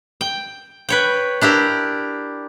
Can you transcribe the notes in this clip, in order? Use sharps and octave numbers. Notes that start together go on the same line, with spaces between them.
G5
B4 C#5 G5
D4 E4 G4 A#4